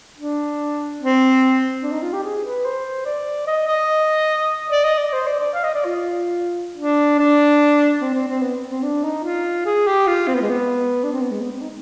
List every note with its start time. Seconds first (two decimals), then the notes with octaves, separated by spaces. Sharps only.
0.17 D4
1.00 C4
1.83 D4
1.92 D#4
2.02 F4
2.13 G4
2.23 G#4
2.45 B4
2.65 C5
3.06 D5
3.47 D#5
3.68 D#5
4.70 D5
4.84 D#5
4.98 D5
5.13 C5
5.27 D5
5.40 D5
5.54 F5
5.64 D#5
5.74 D5
5.85 F4
6.77 D4
7.19 D4
8.01 C4
8.14 C4
8.28 C4
8.42 B3
8.70 C4
8.83 D4
9.04 D#4
9.24 F4
9.66 G#4
9.87 G4
10.07 F4
10.27 C4
10.35 B3
10.41 G#3
10.49 B3
11.04 D4
11.12 C4
11.22 B3
11.31 G#3
11.41 B3
11.51 C4
11.61 D#4